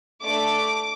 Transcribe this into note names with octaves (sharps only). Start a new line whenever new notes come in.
A3 D4 A4 D6